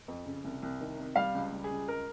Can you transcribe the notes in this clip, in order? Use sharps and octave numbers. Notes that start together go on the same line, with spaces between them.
F2
C#3
C2
C2
D#3
C3
G3 F5
C#2
G3
G#4
C#2
G#3 A#4